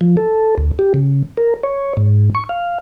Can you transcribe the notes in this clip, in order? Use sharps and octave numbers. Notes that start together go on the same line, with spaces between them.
F3
A4
D2
G4
C#3
A#4
C#5
G#2
C#6
F5